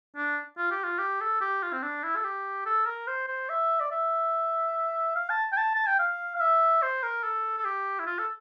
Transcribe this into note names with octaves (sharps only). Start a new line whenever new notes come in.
D4
F4
G4
F4
G4
A4
G4
F4
C4
D4
E4
A4
G4
A4
A#4
C5
C5
E5
D5
E5
F5
A5
G5
A5
A5
G5
F5
F5
E5
C5
A#4
A4
A4
G4
E4
F4
A4